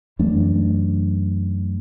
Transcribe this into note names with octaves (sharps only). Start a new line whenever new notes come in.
F#2 E3 A3 D4